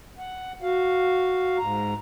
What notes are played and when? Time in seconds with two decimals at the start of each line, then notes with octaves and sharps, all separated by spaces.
0.18 F#5
0.62 F#4 F5
1.58 G#2 A#5